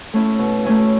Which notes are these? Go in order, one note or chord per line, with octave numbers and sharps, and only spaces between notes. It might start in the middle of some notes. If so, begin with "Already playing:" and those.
A3 C#4 E4
B2
A3 C#4 E4